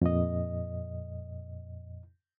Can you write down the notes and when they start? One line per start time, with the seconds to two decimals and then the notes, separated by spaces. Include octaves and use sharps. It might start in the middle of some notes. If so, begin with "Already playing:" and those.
0.02 F2 A#2 D#5